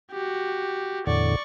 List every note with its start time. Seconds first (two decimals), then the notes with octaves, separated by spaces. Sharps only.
0.12 F#4 G4
1.07 E2 A2 D3 D5 C#6